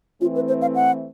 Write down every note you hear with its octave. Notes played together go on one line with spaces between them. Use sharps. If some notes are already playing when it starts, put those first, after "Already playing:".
E3 A3 C4 F4
B4
C5
F5
F#5